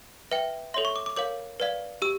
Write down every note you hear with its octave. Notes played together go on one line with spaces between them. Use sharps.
B4 E5 G5
A4 C#5 E5 C6
C#6
D6
D6
A#4 C#5 F5 D6
B4 D5 F5
G4 E6